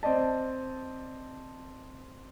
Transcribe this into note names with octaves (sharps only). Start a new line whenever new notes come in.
C4 D5 D#5 A5